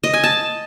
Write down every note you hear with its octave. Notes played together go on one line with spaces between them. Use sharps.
D#5
G#5
A5